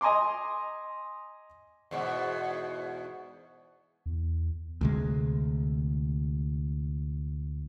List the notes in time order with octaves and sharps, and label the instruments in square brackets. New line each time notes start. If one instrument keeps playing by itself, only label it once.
[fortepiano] D#5 G#5 A#5 C6 D6
[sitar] E2 G#2 B2
[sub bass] E2
[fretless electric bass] D2 C3 G#3